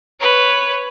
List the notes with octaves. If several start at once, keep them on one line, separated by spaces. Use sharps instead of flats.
B4 C#5